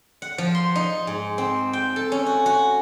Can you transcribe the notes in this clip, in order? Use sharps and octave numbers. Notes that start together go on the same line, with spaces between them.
F#5
F3
C6
D#4
G#2
C4
G5
A4
C#4
F#4
F#4